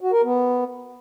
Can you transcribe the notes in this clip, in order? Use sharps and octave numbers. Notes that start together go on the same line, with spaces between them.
F#4
A#4
B3